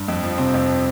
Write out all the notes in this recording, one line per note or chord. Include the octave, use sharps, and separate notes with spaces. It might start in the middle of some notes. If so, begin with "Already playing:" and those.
Already playing: G2
F2
F3
C3 C4
F2